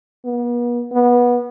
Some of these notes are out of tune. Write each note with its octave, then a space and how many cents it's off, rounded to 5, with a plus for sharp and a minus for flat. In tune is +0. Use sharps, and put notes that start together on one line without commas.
B3 -40
B3 -20